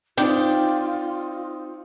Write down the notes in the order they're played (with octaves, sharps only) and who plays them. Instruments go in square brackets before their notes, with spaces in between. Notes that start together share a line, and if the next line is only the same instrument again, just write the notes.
[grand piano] C4 D#4 [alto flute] F4 [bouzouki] D5 G5